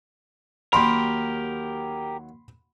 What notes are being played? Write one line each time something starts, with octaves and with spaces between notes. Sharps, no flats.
D#2 F#3 G4 A#4 B5 C6